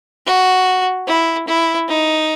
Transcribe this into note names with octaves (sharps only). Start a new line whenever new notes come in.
F#4
E4
E4
D#4